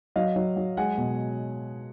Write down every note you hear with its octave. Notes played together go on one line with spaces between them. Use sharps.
F#3 D#5 F5
F#3
F#3
G#3 F#5 G#5
B2